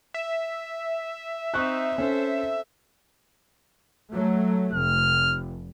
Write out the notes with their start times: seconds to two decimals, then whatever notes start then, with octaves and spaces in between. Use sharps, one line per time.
0.14 E5
1.54 C4 D#4 C#6 F#6
1.98 C#4 A4 C5
4.11 F#3 A3
4.73 F1 F6